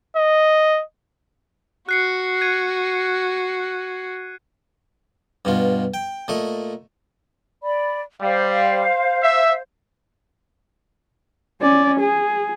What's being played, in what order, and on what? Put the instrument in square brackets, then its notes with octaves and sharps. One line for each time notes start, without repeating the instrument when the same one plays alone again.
[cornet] D#5
[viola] F#4 [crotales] F#6 C7 C#7
[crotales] G#6 D#7
[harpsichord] G2 B2 F4
G5
A#2 A3 D#5
[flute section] D5 B5
[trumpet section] G3 [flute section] C5 F5
[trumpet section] E5
[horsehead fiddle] C#4 D5
G#4